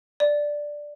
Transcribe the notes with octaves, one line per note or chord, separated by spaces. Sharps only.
D5